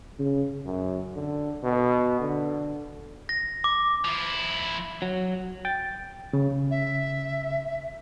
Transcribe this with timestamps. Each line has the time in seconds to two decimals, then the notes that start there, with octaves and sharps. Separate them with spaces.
0.19 C#3
0.66 F#2
1.15 D3
1.64 B2
2.20 D3
3.29 A#6
3.64 D6
4.04 F3 E4
5.02 F#3
5.65 G5 A6
6.33 C#3
6.70 E5